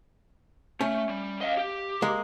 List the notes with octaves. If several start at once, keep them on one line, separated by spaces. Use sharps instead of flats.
A3 C#4
G3
D#5 F5
G4
G#3 A#3